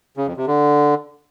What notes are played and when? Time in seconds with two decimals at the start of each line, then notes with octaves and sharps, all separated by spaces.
0.17 C#3
0.27 F2
0.37 C3
0.47 D3